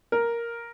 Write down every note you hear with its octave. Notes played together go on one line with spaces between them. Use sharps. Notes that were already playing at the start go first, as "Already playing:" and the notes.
A#4